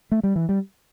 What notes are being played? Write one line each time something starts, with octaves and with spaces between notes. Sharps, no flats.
A3
G3
E3
G3